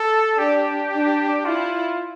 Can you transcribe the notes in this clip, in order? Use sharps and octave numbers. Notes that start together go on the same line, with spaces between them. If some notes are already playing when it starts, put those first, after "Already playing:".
Already playing: A4
D4 G4
D4
E4 F4